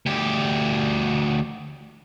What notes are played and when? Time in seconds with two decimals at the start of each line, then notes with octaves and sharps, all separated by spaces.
0.06 D2 G4